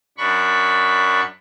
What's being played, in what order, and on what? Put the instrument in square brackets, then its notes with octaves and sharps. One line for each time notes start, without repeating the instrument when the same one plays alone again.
[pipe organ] F#2 D4 B5 C#6